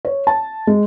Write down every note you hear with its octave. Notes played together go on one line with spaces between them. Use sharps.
C#5
A5
G#3